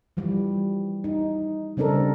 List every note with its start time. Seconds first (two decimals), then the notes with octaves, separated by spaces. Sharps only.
0.17 E3 F3 G3
1.04 D#4
1.77 C#3 G3 C4 D4 A4 A#4